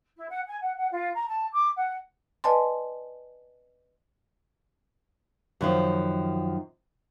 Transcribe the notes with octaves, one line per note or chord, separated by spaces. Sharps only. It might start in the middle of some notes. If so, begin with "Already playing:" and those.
E4
F#5
G#5
F#5
F#5
F4
A#5
A5
D6
F#5
B4 D5 D#5 G#5 A5 C6
F#2 D#3 F3